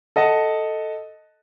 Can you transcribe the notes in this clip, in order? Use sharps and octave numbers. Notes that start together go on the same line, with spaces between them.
A4 D#5 F#5 A5